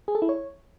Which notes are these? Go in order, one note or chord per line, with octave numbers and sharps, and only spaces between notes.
G#4
A4
E4
C#5